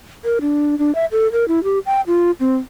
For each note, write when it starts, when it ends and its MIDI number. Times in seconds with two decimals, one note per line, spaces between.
0.24 0.39 70
0.41 0.78 62
0.79 0.94 62
0.95 1.05 76
1.12 1.30 69
1.32 1.47 70
1.48 1.63 64
1.64 1.79 67
1.86 2.01 79
2.07 2.31 65
2.40 2.57 60